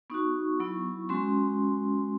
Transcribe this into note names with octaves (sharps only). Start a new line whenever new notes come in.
B3 D#4 F#4 C#6
F#3 B3 E4
G#3 C#4 F#4 C6